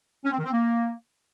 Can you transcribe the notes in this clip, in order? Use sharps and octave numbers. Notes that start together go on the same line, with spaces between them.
C#4
C4
D#3
C4
A#3